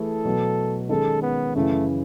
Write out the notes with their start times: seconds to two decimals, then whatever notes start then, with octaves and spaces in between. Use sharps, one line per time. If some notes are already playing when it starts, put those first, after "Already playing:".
Already playing: E3 A3 E4 G#4 A4
0.25 B2 F#3 B3 F#4
0.89 D#3 G#3 C#4 G#4 A4
1.22 B3
1.55 F#2 C#3 E3 A3